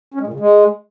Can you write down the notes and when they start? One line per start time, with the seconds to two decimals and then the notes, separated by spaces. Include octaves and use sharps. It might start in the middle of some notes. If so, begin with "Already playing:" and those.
0.14 C#4
0.21 G#3
0.27 A#2
0.33 C#3
0.40 G#3